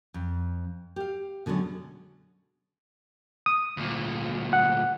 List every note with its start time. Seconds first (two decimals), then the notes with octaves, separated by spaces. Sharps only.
0.14 F2
0.96 G4 F5
1.46 B2 D3 F#3 G#3 C#4
3.46 D#6
3.77 D2 A#2
4.53 F#5